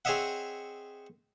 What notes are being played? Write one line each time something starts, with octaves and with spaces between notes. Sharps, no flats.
C4 G#4 C#5 D#5 E5 F#5